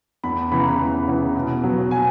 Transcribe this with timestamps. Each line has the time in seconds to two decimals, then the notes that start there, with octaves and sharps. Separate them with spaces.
0.24 E2 B5
0.52 C#3 E3 B3 B5
0.60 A#5
0.68 B5
0.79 E2
1.08 C#3 E3 B3
1.36 B2
1.63 F#3 B3
1.91 B2 G#5